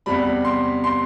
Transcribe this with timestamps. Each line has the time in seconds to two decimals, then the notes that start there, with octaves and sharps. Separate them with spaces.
0.06 E2 C3 G3 B5
0.45 C6
0.84 C6